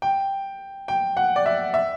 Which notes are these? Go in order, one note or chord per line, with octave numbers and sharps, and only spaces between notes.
G5
G5
F#5
D5
E5
E5